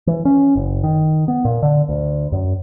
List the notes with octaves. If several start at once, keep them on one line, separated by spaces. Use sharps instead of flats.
E3
C#4
F#1
D#3
B3
A#2
D3
D2
F#2